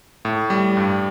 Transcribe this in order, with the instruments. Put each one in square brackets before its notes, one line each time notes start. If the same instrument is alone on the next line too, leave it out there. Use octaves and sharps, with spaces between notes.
[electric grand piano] A2
G3
G2